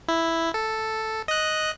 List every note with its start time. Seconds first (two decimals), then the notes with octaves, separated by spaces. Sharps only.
0.08 E4
0.54 A4
1.28 D#5 F#6